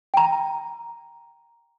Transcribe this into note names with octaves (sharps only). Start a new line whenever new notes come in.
G5 A#5